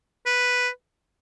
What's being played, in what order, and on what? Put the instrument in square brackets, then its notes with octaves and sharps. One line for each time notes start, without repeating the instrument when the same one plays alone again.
[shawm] B4